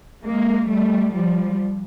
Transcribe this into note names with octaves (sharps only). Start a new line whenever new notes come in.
G#3 A#3
G3 A3
F3 G3